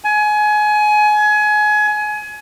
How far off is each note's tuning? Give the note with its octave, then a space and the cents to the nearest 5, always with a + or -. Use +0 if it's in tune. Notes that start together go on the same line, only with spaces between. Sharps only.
G#5 +25